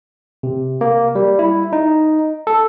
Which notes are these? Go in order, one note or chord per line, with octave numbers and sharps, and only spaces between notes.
C3
A#3
G3
E4
D#4
A4